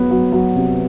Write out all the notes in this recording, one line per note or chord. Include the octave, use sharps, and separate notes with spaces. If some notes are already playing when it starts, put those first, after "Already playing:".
Already playing: F#3 B3 B4
F#3
F#3
C3